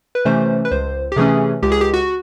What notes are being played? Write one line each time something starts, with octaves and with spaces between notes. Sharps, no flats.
B4
C3 E3 A3 C#4 C5
B4
C#2 C5
G4
C3 E3 A3 C#4 G#4
C#2 G4
G#4
G4
F#4